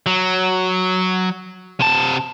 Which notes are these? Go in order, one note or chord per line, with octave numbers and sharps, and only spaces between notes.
F#3
C3 A5